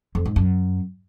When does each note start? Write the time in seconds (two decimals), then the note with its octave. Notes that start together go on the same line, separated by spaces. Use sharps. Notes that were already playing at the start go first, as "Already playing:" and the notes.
0.15 F2
0.25 G#2
0.36 F#2